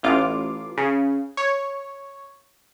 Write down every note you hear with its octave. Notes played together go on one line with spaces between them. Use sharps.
A1 F4 D6
C#3
C#5